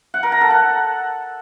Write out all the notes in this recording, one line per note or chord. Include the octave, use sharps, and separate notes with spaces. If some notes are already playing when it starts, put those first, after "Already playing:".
F#5
A#4
A#5
A4
F#5